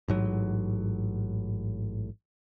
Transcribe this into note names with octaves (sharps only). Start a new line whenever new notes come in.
A1 G#2 F#3